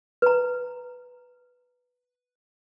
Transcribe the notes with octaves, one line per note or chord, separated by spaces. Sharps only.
B4 A#5